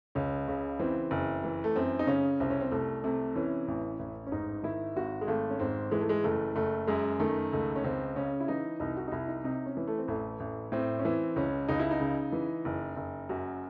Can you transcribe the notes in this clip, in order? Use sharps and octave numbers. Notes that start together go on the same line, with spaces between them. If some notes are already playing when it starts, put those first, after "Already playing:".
C#2 C#4
C#3 C#4
E3 C4
F#1
E3
A3
F#2 C4
D#4
C#3 C#4
C2 C4
C#4
C4
C2 A3
C3 A3
E3 C#4
A1
A1
C#4
G#2 D#4
D#3 E4
G#1 F#4
G#3
G#1 A3
C#4
G#2 C4
E3 G#3
A3
G#3
F#1 A3
F#1 A3
F#2 G#3
D#3 A3
C#2 A3
C#4
C#2 C4
C#3 C#4
E4
E3 D#4
C2 D#4
F#4
D#4
C2 E4
D#4
C3 D#4
C#4
E3
A3
C4
A1 A3
A1
A2 C4
C#4
E3 C4
C#2 C#4
C#2 D#4
E4
D#4
C#3
E3
F#1
F#1
F#2 F#4